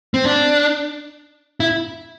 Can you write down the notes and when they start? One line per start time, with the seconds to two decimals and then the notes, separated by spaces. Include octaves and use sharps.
0.14 C4
0.25 D4
1.60 E4